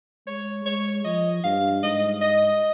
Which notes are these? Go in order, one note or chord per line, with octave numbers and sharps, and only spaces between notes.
G#3 C#5
G#3 C#5
F3 D#5
G2 F5
G#2 D#5
D#5